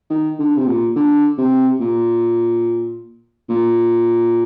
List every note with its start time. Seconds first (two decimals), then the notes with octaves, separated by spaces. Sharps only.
0.10 D#3
0.39 D3
0.57 C3
0.68 A#2
0.96 D3
1.38 C3
1.80 A#2
3.49 A#2